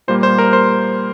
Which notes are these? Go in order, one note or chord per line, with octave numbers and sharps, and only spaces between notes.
A#2 G3 A#3 C5
C5
A#4
C5